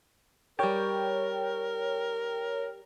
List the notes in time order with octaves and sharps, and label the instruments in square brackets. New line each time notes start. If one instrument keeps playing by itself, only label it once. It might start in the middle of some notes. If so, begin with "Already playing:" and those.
[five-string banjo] G3 G4 [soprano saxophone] A#4 [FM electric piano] C#5 G5